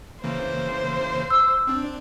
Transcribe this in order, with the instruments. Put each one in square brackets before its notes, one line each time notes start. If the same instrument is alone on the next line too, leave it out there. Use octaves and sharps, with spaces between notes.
[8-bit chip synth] C#3 E3 A#3 [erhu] C5
[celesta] E6
[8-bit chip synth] C4 D4